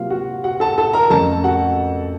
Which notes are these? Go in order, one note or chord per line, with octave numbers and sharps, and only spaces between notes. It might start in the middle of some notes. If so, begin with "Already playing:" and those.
Already playing: C3 F#3 A#3 F4 F5
F#4 F#5
F#4 F#5
A4 A5
A4 A5
A#4 A#5
F2 C#3 A3 A4 A5
F#4 F#5